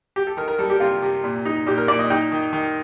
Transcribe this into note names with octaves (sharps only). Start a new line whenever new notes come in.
G4
A4
D#3 A#4
A#4
G3 A4
G4
C3 F4
C3
A#2
D#4
A#2 G4
A#4
A#2 D5
D#5
D#4 G5
D#3
D#3